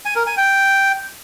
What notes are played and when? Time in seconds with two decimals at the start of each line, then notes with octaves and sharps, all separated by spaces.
0.05 G#5
0.16 A#4
0.27 G#5
0.37 G5